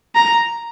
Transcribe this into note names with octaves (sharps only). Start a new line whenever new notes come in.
A#5